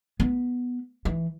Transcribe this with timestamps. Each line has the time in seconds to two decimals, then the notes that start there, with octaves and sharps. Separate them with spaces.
0.20 B3
1.05 E3